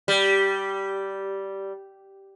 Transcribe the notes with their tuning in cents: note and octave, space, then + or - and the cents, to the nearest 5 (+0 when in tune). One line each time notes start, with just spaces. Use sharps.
G3 -10